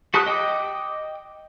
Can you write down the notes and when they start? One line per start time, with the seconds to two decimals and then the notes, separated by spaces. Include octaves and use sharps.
0.14 F#4 G4 A5 D#6 F#6
0.26 D#5 G5 D6 D#6